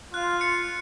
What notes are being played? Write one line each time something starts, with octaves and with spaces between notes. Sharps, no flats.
F4 F#6
C#7